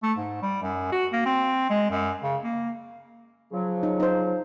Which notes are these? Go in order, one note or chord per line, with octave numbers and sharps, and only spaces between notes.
A3
G#2
G3
F#2
F#4
A#3
C4
G#3
F#2
C#3
A#3
C#3 F3 F#3
D#4
D#4 C5